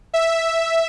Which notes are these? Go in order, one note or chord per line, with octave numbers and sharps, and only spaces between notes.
E5